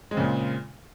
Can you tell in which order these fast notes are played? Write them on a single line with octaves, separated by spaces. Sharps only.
G#3 C4 C#3 A#2